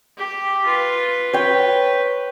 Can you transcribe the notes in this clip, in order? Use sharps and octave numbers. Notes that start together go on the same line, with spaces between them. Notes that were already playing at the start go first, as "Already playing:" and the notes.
G4
F4 B4
B4 C#5 G5